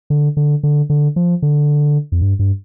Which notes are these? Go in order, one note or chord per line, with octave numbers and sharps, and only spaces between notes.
D3
D3
D3
D3
F3
D3
F2
G2
G2